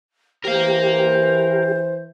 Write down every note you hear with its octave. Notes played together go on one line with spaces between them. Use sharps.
E3 G4 A#4 C5 F5